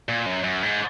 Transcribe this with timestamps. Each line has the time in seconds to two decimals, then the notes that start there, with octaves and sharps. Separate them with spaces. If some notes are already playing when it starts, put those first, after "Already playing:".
0.09 A#2
0.26 F#2
0.44 F#2
0.63 G#2